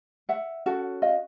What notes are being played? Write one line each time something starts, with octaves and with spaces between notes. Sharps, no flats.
E5 F#5
C#4 F#4 A4
D#5 F5